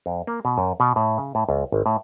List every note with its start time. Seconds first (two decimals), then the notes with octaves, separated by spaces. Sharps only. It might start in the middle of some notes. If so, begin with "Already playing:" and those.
0.06 F2
0.27 A#3
0.45 B2
0.58 F#2
0.80 B2
0.96 A2
1.18 C#3
1.35 A2
1.49 C#2
1.72 G#1
1.86 A2